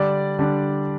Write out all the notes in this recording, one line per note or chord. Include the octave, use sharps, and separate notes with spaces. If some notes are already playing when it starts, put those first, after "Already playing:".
Already playing: D3 G3 D4 D5
D3 G3 D4